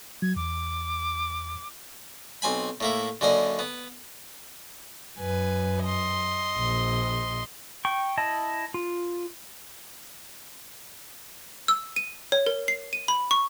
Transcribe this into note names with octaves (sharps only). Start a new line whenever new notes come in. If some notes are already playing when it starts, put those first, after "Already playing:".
F#3 G#6
E2 D6
B1 C4 G#5 B5
A2 A#3 E4
F#2 D3 A#3 D5 D#5
B3
F#2 B4 G#5
D#5 C6
A#1
G5 C#6
E4 D#5 A5
F4
E6
D#7
C#5
A#4
C7
D#7
B5
C#6